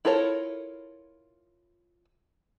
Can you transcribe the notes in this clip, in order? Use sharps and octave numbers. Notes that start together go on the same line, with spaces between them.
E4 F4 A4 A#4 C#5